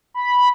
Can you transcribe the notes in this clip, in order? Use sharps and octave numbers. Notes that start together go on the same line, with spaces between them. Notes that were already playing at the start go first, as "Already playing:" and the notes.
B5